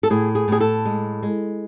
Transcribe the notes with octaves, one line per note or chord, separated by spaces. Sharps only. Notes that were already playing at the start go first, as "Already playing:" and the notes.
A4
A2 G#4
G#4
A2 G#4
A4
G#3
G#3